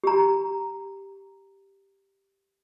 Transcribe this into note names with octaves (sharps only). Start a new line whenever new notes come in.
G4 A#5